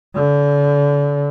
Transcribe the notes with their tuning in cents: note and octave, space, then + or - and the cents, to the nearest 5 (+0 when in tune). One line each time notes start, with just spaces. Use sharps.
D3 -35